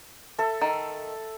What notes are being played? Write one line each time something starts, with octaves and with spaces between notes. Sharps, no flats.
A4 E5
D#3